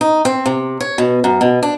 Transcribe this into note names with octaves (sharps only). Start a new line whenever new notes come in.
D#4
C4
C3
C#5
B2
F#2
B2
D4